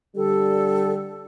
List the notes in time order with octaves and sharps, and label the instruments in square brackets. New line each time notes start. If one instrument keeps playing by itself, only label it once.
[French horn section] D3 G3 [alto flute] A4